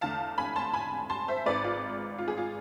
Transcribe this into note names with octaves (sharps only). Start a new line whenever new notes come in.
E2 D3 A3 F5 A5
G#5 B5
A5 C6
G#5 B5
A5 C6
C5 E5
G#1 G#2 G#3 B4 D5
F4
F4
G#4
F4